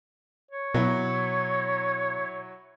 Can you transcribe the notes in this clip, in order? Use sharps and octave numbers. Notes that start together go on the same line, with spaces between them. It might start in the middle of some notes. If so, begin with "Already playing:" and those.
C#5
B2 F#3 E4